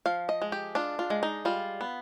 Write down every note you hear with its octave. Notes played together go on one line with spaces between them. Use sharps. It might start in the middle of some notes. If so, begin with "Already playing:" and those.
F3 F5
D#5
G#3
G4
D4 F4
F4
G#3
D#4
G3 F4
B3